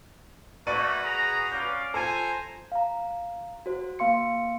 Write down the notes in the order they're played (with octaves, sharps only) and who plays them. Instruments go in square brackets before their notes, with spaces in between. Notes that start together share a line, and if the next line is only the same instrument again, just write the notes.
[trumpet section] A3 A#3 [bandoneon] F#4 B4 [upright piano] D5 C#6 D#7
[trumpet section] G#4 A#5
[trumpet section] C#4 D5 F5 [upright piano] G6
[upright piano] F4 A4 [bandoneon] C5 A#5 [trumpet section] G#5
[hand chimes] F5 A#5
F#4 C5
A#3 F5 C6 C#7